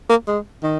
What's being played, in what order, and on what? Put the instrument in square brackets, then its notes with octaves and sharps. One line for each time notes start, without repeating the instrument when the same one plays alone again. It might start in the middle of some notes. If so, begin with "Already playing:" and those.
[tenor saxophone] A#3
G#3
D#3